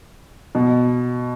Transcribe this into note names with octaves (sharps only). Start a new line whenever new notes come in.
B2